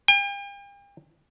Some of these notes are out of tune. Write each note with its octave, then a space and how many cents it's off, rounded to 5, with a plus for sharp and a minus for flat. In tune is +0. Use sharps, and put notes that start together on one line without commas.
G5 +45